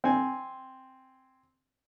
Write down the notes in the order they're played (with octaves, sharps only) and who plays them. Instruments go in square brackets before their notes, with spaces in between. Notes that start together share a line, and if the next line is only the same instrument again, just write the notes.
[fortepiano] C4 G#5